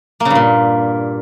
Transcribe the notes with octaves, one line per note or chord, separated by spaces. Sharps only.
A#3
C#3
G2
A#2